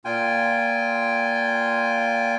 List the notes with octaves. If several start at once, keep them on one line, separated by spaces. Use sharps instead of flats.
A#2 F4 G5 G#5